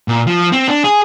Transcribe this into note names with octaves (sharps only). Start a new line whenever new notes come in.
A#2
F3
C4
D4
G#4